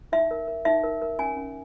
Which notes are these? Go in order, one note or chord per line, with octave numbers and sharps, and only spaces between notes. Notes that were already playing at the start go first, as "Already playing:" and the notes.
D#4 E5
A#4
A#4
D#4 E5
A#4
A#4
C#4 G#5
C#4